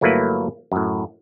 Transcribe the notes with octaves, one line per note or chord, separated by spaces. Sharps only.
G1 F#3 A3 A#3 E4 B4
F#2 A2